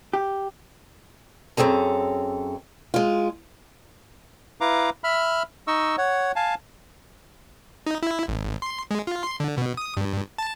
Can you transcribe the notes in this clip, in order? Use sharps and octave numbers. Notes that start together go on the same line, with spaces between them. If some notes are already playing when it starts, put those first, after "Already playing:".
G4
F#2 C4 G#4 A4 A#5
G#3 F4
E4 B4 F5 A#5 D6
E5 B5 F6
D#4 D#5 C#6 E6
C#5 F#5
F5 G#5 A5
D#4
E4
G#1
C6
G#3
F4
C6
D3
B2
D#6
G2
A5